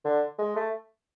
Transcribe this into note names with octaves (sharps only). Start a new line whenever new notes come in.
D3
G#3
A3